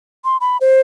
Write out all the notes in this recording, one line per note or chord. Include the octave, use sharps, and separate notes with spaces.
C6
B5
C5